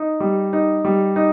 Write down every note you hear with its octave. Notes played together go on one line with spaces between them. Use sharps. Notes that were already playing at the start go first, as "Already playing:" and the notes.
Already playing: D#4
G3
D#4
G3
D#4